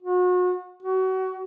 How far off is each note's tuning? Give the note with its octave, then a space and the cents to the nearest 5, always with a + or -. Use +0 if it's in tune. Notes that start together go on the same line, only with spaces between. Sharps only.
F#4 -35
F#4 +30